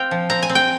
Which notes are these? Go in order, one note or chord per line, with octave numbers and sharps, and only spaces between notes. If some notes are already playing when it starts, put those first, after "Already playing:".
Already playing: C4 F5 G5
F3
C4 A#5
G#5
C4
G5